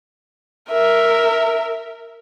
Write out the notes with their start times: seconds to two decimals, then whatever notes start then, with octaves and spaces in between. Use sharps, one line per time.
0.70 A#4 E5